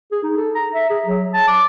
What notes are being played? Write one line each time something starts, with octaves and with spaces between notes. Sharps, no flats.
G#4
D#4
A4
A#5
E5
G#4
F#3
A5
D6